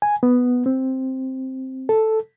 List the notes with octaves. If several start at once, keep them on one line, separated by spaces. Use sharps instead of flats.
G#5
B3
C4
A4